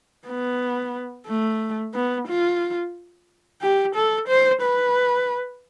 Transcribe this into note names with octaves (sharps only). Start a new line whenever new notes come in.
B3
A3
B3
F4
G4
A4
C5
B4